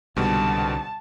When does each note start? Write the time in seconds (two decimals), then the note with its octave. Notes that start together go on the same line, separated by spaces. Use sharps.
0.16 C2 G#2 B2 D3 G3 A5